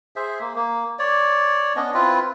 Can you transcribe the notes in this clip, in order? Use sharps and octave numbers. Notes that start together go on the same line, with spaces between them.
G#4 C5 E5
A#3
A#3
C#5 D5
B3 C#4 D4 D#5
C4 E4 F4 B4